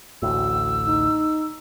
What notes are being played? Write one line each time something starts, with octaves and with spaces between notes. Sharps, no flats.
A1 D2 A2 F#4 E6
D#4